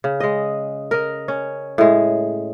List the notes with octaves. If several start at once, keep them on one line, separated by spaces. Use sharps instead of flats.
C#3
G#3 D#5
A#4 D#5
C#4
A2 G#3